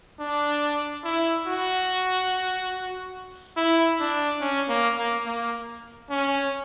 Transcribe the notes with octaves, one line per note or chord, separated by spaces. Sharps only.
D4
E4
F#4
E4
D4
C#4
A#3
A#3
A#3
C#4